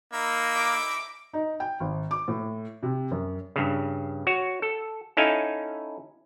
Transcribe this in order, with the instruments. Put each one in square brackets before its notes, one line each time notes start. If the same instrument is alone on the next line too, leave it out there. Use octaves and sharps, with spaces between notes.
[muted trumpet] A#3 [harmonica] D#4 E5 B5
[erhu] D6
[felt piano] D#4
G5
G#1
D6
A2
C3
F#2
[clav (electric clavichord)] G2 C#3
F#4 C#5
A4
C#4 D#4 E4 A4 F5 G#5